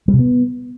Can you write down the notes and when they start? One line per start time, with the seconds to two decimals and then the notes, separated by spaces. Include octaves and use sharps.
0.08 G3
0.14 C3
0.19 B3